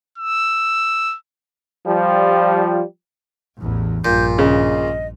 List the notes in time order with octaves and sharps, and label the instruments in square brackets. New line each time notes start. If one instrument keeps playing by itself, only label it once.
[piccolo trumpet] E6
[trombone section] F3 G3
[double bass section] A1 E2
[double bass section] A#1 G2 [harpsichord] A#2 [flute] G6
[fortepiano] C#3 [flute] D#5